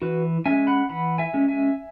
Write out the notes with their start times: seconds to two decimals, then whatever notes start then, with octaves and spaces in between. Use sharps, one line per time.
0.02 E3 F#4 B4
0.46 G#3 C#4 E5 G#5
0.67 F#5 B5
0.89 E3 F#5 B5
1.18 E5 G#5
1.33 G#3 C#4
1.48 E5 G#5